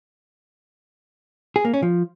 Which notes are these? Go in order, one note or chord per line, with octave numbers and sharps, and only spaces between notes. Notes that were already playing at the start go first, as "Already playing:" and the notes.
G#4
A#3
C#4
F3